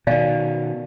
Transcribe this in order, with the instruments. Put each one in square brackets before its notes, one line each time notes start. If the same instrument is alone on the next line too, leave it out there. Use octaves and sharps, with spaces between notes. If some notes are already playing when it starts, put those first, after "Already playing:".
[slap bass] B2 D#3 [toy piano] D5 F5 G#5